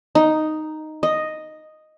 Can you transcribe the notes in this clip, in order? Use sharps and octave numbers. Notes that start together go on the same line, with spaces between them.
D#4
D#5